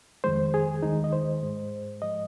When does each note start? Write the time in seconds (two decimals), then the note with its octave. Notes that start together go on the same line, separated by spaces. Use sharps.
0.24 F2 D#3 G#3 C5
0.54 G#4
0.83 D#2 D#3 G#3 D#4
1.04 D#5
1.13 C5
1.42 G#2 G#3
2.02 G#2 F3 G#3 D#5